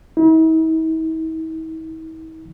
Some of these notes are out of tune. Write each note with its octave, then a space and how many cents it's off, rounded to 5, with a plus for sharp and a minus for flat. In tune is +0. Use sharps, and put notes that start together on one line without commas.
E4 -45